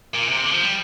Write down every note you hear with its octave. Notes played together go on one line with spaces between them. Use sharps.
A#2
C3
D3
F3
G3